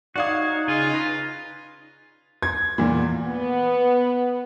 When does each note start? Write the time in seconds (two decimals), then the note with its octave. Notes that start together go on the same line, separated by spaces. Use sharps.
0.16 D#4 F#4 C#5 D5 F5 D#6
0.68 C#3 F4 G#4 D#5
0.94 B4 A#5
2.43 G#6
2.78 E2 A#2
3.26 B3